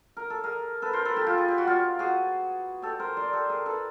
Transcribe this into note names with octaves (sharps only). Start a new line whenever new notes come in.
A#4
A4
G#4 A#4
A4 B4
A#4 C5
A4 B4
G4 A4
F4 G4
G#4
G4
F#4
F4 G4
F#4 G#4
G4 A4
A#4 C5
C5 D5
G4 A4
G#4 A#4
A4 B4